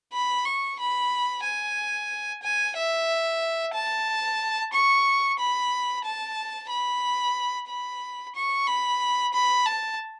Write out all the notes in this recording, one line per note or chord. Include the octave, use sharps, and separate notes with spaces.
B5
C#6
B5
G#5
G#5
E5
A5
C#6
B5
A5
B5
B5
C#6
B5
B5
A5